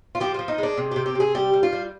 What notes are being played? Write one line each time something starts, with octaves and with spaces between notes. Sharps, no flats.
F4
F3 G4
F3 F4
D#4
G#3 D4
C3
C3 G4
G4
C3 G#4
G3 G4
G3
F4
G3